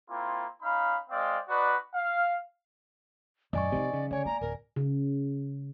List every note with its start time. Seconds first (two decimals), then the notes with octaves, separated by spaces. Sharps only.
0.10 A#3 C4 E4 F4
0.62 C#4 D#4 F5 B5
1.10 G#3 C4 D5 F5
1.49 D#4 F#4 B4 D5
1.94 F5
3.53 F#2 A#2 D5 D#5 G#5 C#6
3.72 C3 F3 D#4
3.93 C#3
4.11 D3 C#5 D5 G#5
4.25 A#3 A#5
4.41 D1 A#4
4.76 C#3